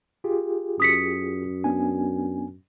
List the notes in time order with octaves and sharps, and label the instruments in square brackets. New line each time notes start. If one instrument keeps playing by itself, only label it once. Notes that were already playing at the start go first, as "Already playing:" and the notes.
[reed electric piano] F4 G4 G#4
[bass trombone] F#2 [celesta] D#6 B6 C#7
[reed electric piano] B3 D4 G#5